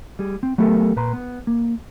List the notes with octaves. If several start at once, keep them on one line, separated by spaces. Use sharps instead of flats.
G3 G#4
C4
F#3 A3 B3 G4 A4 A#4
A#2 B4 A#5 C6
B3
A#3